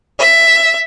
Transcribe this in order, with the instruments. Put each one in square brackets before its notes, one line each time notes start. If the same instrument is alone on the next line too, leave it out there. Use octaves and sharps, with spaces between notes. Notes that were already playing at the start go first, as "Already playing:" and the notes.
[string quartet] E5